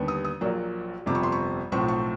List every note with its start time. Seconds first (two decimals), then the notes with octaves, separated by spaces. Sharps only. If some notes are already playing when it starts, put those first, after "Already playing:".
Already playing: D#2 D3 G3 B3
0.08 D#6
0.24 D#6
0.41 A#1 A#2 F#3 A#3
1.06 G1 F2 C3 D6
1.15 C#6
1.23 C6
1.32 C#6
1.72 B1 A2 F3 A3 C4 C#6
1.88 C#6